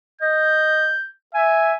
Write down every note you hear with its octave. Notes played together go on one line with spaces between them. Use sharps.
D#5 G6
E5 G#5